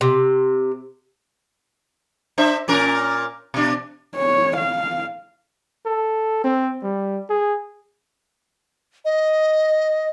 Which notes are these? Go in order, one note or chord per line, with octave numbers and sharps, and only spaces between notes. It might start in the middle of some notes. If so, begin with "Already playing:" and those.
C3
D4 C5 E5
A#2 C#4 A#4
B2 D4
C#5
F5
A4
C4
G3
G#4
D#5